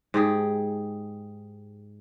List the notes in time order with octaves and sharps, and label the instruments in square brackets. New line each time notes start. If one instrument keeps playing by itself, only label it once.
[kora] G#2 G4 G#4